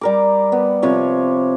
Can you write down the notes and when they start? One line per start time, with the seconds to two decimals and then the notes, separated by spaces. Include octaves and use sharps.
0.01 G3 A#4 D6
0.52 B3
0.82 C3 F3 B4 C#5